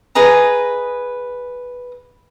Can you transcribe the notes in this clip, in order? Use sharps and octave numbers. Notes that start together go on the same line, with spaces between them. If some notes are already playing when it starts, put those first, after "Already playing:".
G#4 B4 D#5 A#5